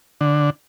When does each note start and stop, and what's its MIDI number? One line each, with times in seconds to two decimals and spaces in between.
0.21 0.50 50